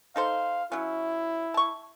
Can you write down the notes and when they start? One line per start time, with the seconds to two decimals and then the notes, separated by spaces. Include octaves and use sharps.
0.16 D#4 A4 C5 F5
0.72 F#3 C#4 E4
1.54 A5 C#6